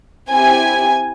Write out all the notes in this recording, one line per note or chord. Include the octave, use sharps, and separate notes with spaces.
C4 E4 G4 G#5